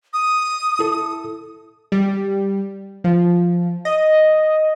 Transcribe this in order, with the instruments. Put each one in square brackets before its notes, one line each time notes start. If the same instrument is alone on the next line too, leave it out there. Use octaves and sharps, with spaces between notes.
[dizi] D#6
[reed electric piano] E4 A4
[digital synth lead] G3
F3
D#5